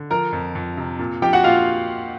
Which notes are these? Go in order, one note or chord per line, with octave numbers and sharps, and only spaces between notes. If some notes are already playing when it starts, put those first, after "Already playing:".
Already playing: D3
F3 A#4 A#5
F2
F2
C3
A#2
F3 G4 G5
F#4 F#5
A#2 F4 F5